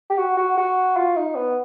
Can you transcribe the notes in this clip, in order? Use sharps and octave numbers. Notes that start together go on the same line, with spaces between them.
G4
F#4
F#4
F#4
F4
D#4
B3